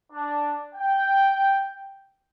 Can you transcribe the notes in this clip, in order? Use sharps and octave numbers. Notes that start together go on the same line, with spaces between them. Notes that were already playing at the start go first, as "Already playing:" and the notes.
D4
G5